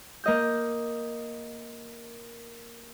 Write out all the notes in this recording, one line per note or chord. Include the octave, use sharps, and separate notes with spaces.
A#3 D#5 G6